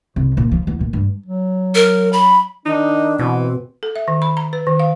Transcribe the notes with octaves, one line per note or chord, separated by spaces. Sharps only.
C2
A#2
F3
E2
A#2
G2
F#3
A#4
B5
D#3 D4 D#4
B2 E3 C4
A4
E5
D#3
B5
A#5
B4
D#3
F5